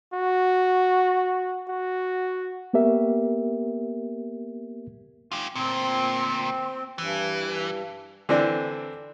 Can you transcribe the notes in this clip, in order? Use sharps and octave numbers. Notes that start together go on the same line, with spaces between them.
F#4
F#4
A#3 B3 G4 A#4 E5
F4 G4
D2 A#2 C4
G2 E3
D3 E3 C4 D4